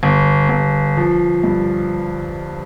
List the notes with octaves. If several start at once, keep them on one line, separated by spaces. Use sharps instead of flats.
G1
G1
F3
G2